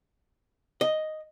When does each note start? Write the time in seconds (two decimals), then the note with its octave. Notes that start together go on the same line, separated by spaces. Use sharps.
0.81 D#5